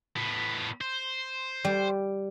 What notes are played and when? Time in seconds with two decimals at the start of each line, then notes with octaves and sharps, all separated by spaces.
0.17 A2 B3
0.81 C5
1.65 G3